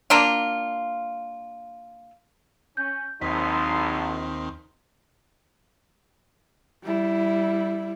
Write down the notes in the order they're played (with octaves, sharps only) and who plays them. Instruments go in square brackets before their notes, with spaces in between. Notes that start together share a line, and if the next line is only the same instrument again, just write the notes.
[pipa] A#3 D4 F4
[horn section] C#4 [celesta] G6
[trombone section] A#1 [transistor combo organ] D#2 C4 [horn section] F#3 D#4 C6 [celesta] B6
[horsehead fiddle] G3 E4